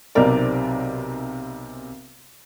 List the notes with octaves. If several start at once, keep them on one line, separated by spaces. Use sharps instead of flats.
B1 C3 B3 D#4 A#4 D5